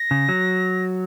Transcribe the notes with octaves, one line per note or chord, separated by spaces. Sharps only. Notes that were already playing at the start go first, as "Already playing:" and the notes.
Already playing: A#6
C#3
F#3